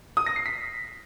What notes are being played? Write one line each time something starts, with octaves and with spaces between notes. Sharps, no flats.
D#6
A#6
C7
B6